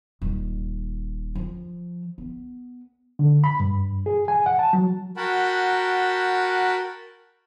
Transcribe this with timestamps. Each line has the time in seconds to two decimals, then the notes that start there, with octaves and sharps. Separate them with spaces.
0.22 D#1
1.35 F3
2.18 B3
3.19 D3
3.44 B5
3.60 G2
4.06 G#4
4.28 G#5
4.46 F#5
4.59 A5
4.73 F#3
5.17 F#4 A#4 F#5 G5 A5 B5